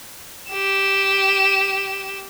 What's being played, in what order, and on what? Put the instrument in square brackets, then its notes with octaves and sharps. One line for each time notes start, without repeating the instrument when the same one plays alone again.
[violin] G4 E7